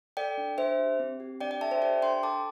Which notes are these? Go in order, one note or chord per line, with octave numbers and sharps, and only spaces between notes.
A4 D5 G5
D4
D4 C5 E5
G4
C4
G4
D4 D5 G5
D5 G5
A4 E5 A5
C5 E5
G4 D5 G5
D4 G5 C6
A4 A5 D6